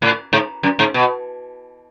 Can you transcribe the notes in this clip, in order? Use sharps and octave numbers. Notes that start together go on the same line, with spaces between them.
A2
G#2
F#2
G#2
B2